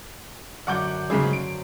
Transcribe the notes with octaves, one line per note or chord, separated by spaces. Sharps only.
F#2 D3 F#5 D6 G6
G#2 C#3 F#3 G#4 C5
D7